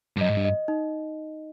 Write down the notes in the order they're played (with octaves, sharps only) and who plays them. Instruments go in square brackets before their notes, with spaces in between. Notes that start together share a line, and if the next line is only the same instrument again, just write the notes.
[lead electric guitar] G2
[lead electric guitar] F#2 [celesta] D#5
[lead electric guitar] G#2
G2
[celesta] D#5
D#4